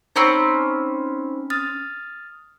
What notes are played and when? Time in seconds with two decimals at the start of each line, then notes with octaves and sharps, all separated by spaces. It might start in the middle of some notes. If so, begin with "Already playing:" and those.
0.16 C4 C#4 D#4 C5 A#5 B5
1.50 D#6 F6 A6